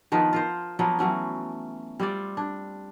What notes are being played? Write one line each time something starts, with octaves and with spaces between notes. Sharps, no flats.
D#3 F3 B3 B4
F4 A#4 C5
F3 F#3 A#3 B3
E3 F#3 A3 C#4
G3 C4 F4 D5
D4